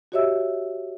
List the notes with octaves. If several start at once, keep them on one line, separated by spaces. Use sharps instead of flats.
F#4 G4 C#5 D#5 E5 E6